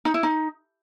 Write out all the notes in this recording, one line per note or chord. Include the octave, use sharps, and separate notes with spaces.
D#4
E4
D#4